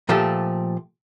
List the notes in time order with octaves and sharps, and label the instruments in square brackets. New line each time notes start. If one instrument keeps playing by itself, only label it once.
[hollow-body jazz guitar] A#2 F3 A3 G4 A4